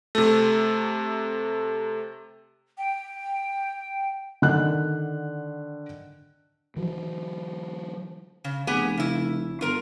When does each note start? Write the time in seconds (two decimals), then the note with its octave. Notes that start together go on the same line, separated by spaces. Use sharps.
0.15 C3 A3
2.78 G5
4.42 D3 D#3 F#5 F#6
6.76 E3 F#3
8.44 C#3
8.67 F1 B3 G4 G#4
8.97 C#3 E4
9.61 G1 F4 A#4 A#5